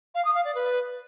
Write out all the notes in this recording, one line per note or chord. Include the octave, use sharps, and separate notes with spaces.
F5
D#6
F5
D5
B4